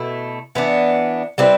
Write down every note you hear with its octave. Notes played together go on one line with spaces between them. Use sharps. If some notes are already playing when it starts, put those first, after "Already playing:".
Already playing: B2 A3 E4
E3 B3 D4
G3 C4 E4 B4